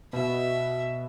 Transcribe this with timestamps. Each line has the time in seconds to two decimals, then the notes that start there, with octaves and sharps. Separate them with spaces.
0.13 B2 E5